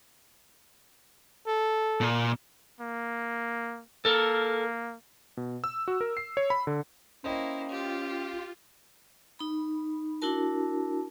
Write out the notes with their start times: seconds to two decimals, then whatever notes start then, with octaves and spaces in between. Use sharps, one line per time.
1.47 A4
2.01 A#2
2.80 A#3
4.05 A#3 A4 A#4
5.37 B2
5.64 E6
5.88 F#4
6.01 A#4
6.17 C7
6.37 C#5
6.50 B5
6.67 D3
7.24 A#3 C#4 E4 C5 D#5 G5
7.70 F4 G4
9.39 D#4 B5
10.22 D4 E4 F#4 A#4 A5